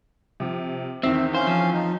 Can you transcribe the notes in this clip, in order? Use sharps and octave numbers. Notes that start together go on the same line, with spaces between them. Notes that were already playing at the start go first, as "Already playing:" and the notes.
C3 F3
E2 D#3 C4 E5
C#4 C5 F5
F3
D#4